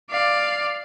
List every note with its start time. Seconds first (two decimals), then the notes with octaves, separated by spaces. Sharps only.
0.11 D5 F5